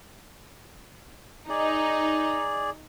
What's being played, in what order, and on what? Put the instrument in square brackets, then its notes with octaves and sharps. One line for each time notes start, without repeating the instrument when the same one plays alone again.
[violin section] D#4 [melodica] G#4 D5